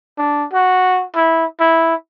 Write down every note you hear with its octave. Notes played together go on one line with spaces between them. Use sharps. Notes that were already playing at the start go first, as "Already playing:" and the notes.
D4
F#4
E4
E4